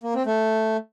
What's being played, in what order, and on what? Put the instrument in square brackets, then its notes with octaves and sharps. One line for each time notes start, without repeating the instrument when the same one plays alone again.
[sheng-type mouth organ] A#3
C4
A3